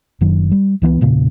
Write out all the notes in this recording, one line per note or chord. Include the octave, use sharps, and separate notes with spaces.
F#1 F#2 D#3 F#3
G3
C#2 E3 A3 B3
E1 A#2 C#3